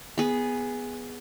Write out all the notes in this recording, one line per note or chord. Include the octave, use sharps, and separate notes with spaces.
B3 G#4